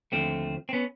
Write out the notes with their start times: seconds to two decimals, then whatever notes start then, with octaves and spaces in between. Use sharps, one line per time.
0.12 D#2 D3 F3 A3 C4
0.69 C4
0.73 B3 C#4